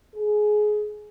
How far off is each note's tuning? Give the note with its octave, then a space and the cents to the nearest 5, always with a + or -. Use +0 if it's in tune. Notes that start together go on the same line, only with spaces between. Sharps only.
G#4 +20